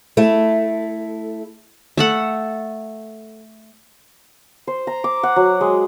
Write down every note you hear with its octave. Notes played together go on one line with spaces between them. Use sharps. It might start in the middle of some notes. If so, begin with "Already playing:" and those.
A3 E4
A3 A4 F#5
C5
A#5
D6
F#5
F#3
G#3